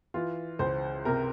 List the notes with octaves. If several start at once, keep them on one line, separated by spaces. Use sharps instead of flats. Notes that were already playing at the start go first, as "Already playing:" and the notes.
E3 F4
C#2 C5
C3 A#4